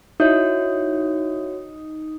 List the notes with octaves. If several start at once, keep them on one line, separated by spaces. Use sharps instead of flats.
D#4 E4 F#4 C#5 E5 G6